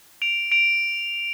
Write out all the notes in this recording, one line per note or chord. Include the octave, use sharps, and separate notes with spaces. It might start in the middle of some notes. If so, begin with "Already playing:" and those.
D7 F7
D7 F7